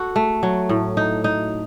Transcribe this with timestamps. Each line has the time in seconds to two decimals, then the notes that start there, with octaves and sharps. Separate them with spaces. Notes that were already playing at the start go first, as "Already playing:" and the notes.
Already playing: F#4 A4
0.16 A3
0.43 F#3
0.69 A2
0.97 D#4
1.24 D#4